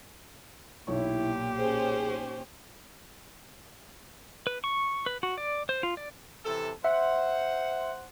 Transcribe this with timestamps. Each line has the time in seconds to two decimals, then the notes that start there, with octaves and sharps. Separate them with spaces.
0.87 B1 A#2 E4 G4 C#5 C#6
1.57 C#4 G#4 C5
4.47 B4
4.64 C#6
5.06 B4
5.23 F#4
5.38 D5
5.69 C5
5.83 F4
5.97 D5
6.45 C3 E3 A4
6.85 C5 E5 F#5